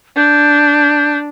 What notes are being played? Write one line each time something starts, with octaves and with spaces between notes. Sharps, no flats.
D4 G6